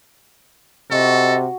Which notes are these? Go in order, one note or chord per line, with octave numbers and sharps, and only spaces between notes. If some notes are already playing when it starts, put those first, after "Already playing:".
C3 F#4 A4 D#5